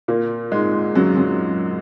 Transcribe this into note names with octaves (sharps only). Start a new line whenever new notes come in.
A#2 A#3
G#2 G#3
F#2 F#3
F#2 F#3